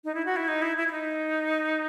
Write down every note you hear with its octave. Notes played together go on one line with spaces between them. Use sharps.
D#4
E4
F#4
E4
D#4
E4
E4
E4
D#4